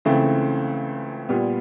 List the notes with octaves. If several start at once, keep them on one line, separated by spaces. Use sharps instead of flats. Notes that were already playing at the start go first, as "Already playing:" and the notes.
C#2 C#3 E3 A3 C4
A#2 G3 B3